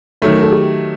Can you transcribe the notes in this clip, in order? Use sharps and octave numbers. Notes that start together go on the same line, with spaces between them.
D#3 F#3 A3 A4
A#4
A4
G#4
G4